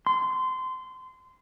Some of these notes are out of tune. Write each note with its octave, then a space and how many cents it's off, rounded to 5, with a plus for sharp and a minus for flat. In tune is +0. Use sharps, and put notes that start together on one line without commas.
C6 -20